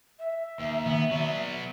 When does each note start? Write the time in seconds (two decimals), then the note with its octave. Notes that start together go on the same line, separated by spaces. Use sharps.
0.19 E5
0.59 D#2
0.86 D#3 A#3 B3
1.11 F#3 B3 C#5 D5